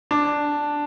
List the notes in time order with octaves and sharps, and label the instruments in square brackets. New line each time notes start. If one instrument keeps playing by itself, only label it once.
[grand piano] D4